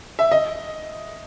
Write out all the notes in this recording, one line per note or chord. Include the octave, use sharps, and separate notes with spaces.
E5
D#5